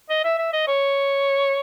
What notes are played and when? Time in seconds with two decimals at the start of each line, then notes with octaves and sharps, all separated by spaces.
0.10 D#5
0.25 E5
0.39 E5
0.53 D#5
0.68 C#5